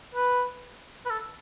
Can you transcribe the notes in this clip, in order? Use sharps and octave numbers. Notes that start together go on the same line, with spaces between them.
B4
B4
A4